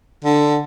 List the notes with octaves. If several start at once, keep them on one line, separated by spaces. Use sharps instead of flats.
D3